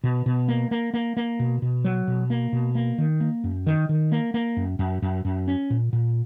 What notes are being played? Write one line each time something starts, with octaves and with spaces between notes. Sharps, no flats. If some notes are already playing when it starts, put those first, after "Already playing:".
B2
B2
A#3
A#3
A#3
A#3
B2
B2
F#3
B2
A#3
B2
A#3
D#3
A#3
F#2
D#3
D#3
A#3
A#3
F#2
F#2
F#2
F#2
C#4
A#2
A#2